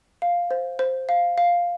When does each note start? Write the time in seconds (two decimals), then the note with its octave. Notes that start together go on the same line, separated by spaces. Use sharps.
0.22 F5
0.51 C5
0.79 C5
1.09 F5
1.38 F5